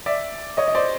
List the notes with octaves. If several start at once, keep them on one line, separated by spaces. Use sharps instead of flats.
D5 E5
C#5 D#5
D#5
C5 D5